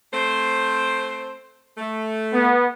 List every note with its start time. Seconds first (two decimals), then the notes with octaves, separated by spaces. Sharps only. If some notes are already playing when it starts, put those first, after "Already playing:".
0.14 A3 C4 C5
1.78 A3
2.32 B3